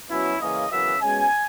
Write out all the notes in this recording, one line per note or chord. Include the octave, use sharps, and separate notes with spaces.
B2 F#3 C#4 E4
C#3 E3 A#3 C#4 D#5
F#2 C#3 E3 B3 E5
B2 G#3 C#4 G#5